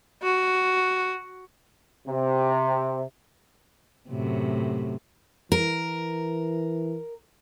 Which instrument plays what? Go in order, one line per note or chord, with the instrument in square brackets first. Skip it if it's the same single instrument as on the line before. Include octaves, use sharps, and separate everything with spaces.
[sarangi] F#4
[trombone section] C3
[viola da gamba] F#2 A2 C3
[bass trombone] E3 [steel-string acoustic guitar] A#4